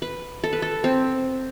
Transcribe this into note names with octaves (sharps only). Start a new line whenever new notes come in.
B4
A4
B4
A4
C4